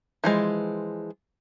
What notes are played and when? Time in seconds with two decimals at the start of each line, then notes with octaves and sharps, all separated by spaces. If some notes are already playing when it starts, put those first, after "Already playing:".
0.24 E3 F3 G#3